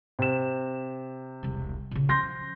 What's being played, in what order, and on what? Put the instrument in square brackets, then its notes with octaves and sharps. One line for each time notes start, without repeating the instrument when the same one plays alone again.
[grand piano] C3 E7
[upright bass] E1 C2
A#2 C#3
[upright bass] F3 C#4 [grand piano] C6 G6 A#6